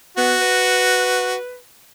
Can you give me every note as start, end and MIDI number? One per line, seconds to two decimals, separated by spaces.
0.17 0.36 59
0.17 1.35 66
0.41 1.57 71